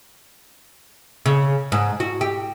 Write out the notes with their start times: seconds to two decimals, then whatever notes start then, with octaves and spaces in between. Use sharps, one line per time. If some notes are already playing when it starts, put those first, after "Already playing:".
1.26 C#3
1.72 G#2
2.00 F#4
2.21 G4